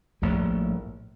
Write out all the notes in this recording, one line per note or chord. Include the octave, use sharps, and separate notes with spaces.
A#1 A2 G3